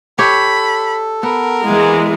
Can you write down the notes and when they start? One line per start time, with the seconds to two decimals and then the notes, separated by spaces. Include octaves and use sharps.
0.19 G4 A4 C#5 B5
1.23 B3 A#4
1.64 E3 G#3 A#3